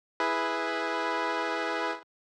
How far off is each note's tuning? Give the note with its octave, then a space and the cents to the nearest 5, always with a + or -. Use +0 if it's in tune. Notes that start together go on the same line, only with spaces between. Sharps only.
E4 +0 G#4 +0 B4 +0